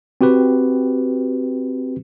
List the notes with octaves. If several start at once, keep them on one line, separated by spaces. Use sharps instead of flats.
C4 F#4 G4 B4